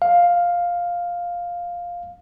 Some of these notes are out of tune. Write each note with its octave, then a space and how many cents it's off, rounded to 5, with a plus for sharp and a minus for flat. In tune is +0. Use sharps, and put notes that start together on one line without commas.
F5 +5